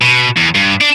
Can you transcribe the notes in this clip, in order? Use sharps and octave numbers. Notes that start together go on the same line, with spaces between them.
B2
E2
G2
D4